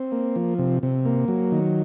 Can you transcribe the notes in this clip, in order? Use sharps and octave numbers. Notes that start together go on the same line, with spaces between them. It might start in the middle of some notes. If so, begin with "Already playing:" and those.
Already playing: C4
A#3
F3
C3
C3
A#3
F#3
D#3